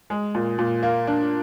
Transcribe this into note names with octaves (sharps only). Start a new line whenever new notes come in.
G#3
A#2
A#2
A#3
D4